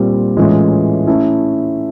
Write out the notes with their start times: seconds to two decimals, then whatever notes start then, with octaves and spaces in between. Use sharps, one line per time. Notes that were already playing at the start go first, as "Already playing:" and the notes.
Already playing: A#2 G3 C4 F4
0.37 A2 E3 G#3 C#4 F4
1.07 A3 C#4 E4